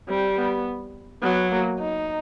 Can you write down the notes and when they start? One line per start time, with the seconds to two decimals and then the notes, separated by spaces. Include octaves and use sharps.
0.08 G3 C4
0.36 B3
1.23 F#3 B3
1.51 A#3
1.80 D#4